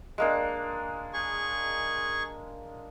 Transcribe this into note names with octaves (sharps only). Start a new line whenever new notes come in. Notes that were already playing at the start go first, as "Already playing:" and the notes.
G#3 A#3 D4
G#4 C#6